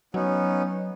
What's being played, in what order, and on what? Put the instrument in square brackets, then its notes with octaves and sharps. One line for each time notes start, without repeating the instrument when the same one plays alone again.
[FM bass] F#3 [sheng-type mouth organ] B3 C#4 D#4